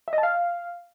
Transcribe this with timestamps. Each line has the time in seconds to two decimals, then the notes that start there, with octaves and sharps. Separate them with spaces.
0.08 E5
0.13 D#5
0.18 A5
0.23 F5